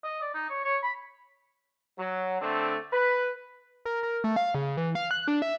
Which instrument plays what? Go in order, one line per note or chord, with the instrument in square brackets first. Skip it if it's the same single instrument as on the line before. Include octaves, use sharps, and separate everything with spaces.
[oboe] D#5
D5
D#4
C#5
C#5
B5
[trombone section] F#3
D3 A3 C4 D4
B4
[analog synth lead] A#4
A#4
A3
F5
C#3
E3
F5
F#6
D4
E5